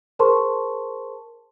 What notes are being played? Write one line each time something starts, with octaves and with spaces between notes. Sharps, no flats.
G#4 A#4 C5 A5 C6 C#6